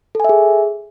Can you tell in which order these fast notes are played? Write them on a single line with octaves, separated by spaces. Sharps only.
A4 G#5 E5 G#4